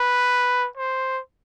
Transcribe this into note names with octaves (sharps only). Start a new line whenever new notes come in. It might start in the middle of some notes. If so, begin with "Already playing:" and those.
Already playing: B4
C5